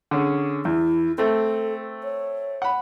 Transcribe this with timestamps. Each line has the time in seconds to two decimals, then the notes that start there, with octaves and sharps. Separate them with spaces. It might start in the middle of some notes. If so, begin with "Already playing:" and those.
0.11 D3 C#4 G#4
0.65 E2 E4
1.18 A3 C4 A4
2.03 C#5
2.62 F#5 B5